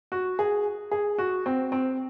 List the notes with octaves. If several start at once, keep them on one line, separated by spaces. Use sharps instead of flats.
F#4
G#4
G#4
F#4
C4
C4